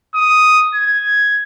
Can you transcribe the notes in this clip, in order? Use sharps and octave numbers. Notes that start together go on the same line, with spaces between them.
D#6
G#6